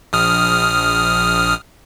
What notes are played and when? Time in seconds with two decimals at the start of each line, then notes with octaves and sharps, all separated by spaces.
0.13 A#1 D#6 F6